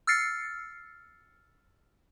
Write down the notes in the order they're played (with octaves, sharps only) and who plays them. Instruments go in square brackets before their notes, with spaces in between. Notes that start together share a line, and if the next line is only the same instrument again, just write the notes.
[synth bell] E6 F6 A6 C7 C#7